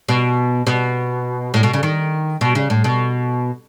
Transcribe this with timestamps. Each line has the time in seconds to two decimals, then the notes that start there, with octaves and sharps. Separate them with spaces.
0.08 B2
0.67 B2
1.54 A2
1.63 B2
1.73 C#3
1.83 D#3
2.41 B2
2.55 C#3
2.70 A2
2.84 B2